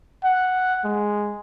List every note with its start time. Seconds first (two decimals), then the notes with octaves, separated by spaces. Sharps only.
0.24 F#5
0.84 G#3